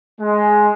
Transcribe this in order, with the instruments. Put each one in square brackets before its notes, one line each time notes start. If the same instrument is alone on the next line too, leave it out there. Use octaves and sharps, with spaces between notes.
[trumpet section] G#3